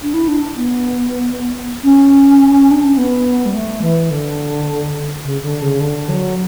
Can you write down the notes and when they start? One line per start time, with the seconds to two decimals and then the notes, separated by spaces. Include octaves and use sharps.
0.03 D4
0.14 E4
0.28 D4
0.56 B3
1.83 C#4
2.71 D4
2.84 C#4
2.97 B3
3.46 G3
3.54 A3
3.82 E3
4.11 D3
5.24 C#3
5.43 D3
5.62 C#3
5.80 D3
6.09 F#3